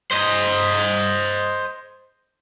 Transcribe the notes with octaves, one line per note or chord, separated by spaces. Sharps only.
C5 D#5